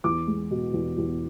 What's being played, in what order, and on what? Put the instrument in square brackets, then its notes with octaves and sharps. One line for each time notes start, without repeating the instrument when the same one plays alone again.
[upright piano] E2 D6
G#3
B2
E2
E2